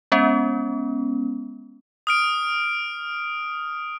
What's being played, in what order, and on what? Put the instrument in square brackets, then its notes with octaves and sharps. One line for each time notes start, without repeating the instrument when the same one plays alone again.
[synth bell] G#3 B3 C#4
[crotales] D#6 F6 D7